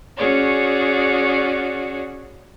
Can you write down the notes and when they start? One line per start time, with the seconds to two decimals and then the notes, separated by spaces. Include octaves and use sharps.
0.16 C#4 F#4 G#4 C#5 D5